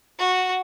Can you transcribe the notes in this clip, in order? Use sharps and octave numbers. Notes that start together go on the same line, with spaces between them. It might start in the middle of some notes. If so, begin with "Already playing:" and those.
F#4